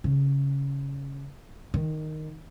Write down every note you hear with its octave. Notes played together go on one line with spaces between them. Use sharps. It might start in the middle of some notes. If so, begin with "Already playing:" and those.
C#3
D#3